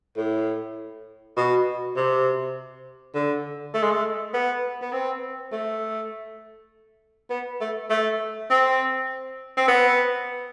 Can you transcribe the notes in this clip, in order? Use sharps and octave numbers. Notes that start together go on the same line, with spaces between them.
A2
B2
C3
D3
A3
G#3
A3
B3
B3
C4
A3
B3
A3
A3
C4
C4
B3